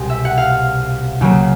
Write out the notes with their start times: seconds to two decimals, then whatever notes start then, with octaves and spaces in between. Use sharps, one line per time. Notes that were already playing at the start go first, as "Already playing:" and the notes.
Already playing: C2 B2 G#3 C4
0.10 E5
0.25 F#5
0.38 F5
1.21 C#2 C#3 F#3 A#3